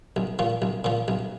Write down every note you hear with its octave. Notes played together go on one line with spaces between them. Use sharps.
B1
A#2 F3
B1
A#2 F3
B1